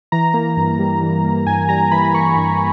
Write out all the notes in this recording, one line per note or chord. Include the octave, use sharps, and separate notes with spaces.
E3 A#5
A#3
G2
G3
E3
A#3
G2 G#5
G3 A#5
E3 B5
A#3 C#6
G2